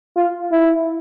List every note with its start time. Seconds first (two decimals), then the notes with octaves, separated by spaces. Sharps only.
0.17 F4
0.52 E4